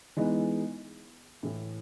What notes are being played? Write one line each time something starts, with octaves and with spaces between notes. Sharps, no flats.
E3 G#3 B3 D#4
A2 E3 A3